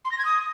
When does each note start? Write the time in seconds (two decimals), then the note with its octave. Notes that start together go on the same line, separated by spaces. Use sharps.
0.04 C6
0.11 A#6
0.18 G#6
0.25 D#6